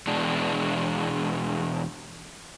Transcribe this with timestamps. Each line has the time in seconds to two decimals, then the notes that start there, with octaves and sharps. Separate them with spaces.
0.07 E2 B2 G#3 D4